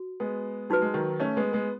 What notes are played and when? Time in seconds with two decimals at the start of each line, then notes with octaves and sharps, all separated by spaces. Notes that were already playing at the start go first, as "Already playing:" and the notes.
Already playing: F#4
0.20 G#3 B3
0.70 F#3 D#4 F#4 B4
0.82 G#3
0.94 D#3 F#3
1.20 A3 C#4
1.37 G#3 B3
1.53 G#3 B3